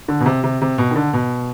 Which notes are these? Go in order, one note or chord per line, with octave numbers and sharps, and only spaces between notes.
D3
B2
C3
C3
C3
B2
D#3
D3
B2